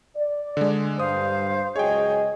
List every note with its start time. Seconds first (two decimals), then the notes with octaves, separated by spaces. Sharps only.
0.15 D5
0.57 D3 G#3
0.99 G2 C5 F5 D#6
1.76 C#2 F#3 G#4 C#5 D#5 G5